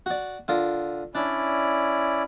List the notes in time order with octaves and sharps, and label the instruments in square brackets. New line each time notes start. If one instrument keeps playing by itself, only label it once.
[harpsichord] F#4 D5
D3 F4 A#4
[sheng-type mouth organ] C#4 E4 D5 [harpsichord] D4